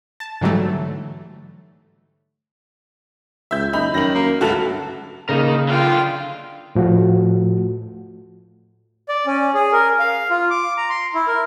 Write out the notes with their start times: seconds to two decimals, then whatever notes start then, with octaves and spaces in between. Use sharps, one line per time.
0.20 A5
0.41 G#2 D3 E3 F#3 G3 A3
3.51 C#2 E5 G6
3.73 F#1 D#4 B5
3.94 F#2 D#3 A#6 F#7
4.15 A#3
4.41 C#2 G2 D3 A3 F#4
5.29 C#3 A#3 D#4 A#4
5.69 D3 F4 F5 G5
6.75 A2 F3 A3 F#4
9.09 D5
9.26 C#4
9.55 G#4
9.72 A#4
9.99 F5
10.31 F4
10.50 D6
10.77 A#5
10.90 C6
11.14 E4
11.27 A#4